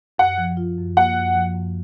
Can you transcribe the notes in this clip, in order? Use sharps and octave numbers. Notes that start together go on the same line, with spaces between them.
F#2 F#5
F3
F4
F#2
A#3 F#5
F#2
F3
F#2